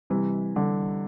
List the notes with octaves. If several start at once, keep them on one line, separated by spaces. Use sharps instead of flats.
C3 E3 G3
D3 G3